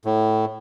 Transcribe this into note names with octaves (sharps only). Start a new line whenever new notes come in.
A2